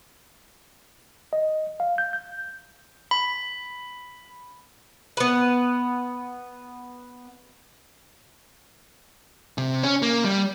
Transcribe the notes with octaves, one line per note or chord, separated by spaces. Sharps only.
D#5
F5
G6
G6
B5
B3 B4
C3
C#4
A#3
G3